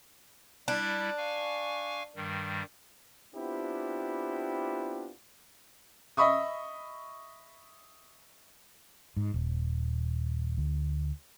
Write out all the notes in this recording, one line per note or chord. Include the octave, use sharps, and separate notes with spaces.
G3 D4 E4
F5 G#5 C#6
G2 D#3 G3
B3 C4 D4 E4 F4 G4
D#5 E5 B5 C#6 D#6
G#2
D#1
D2